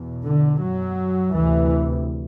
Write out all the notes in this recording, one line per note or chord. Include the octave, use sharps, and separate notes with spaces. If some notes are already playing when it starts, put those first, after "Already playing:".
Already playing: E2 B2
D3
F#2 F#3
D2 C3 E3